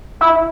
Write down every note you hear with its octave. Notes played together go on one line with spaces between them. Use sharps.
E4